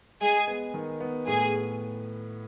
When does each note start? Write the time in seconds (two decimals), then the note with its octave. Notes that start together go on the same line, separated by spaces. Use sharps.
0.21 G#3 G#4 G#5
0.47 B3
0.74 D#3
1.01 B3
1.27 A2 G#4 G#5